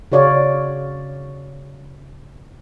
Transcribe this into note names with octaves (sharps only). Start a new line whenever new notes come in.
C#3 F#4 C#5 D5 F5